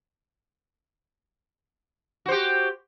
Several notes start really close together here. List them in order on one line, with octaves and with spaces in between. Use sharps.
F#4 C5 G4